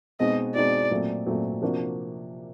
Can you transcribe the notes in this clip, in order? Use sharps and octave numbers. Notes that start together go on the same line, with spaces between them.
B2 G#3 C4 D#4 F#4 D#5
B2 G#3 C4 D#4 F#4 D5
A#2 F#3 A3 C4
A#2 F#3 A3 C4
C3 F3 A#3 D4 F#4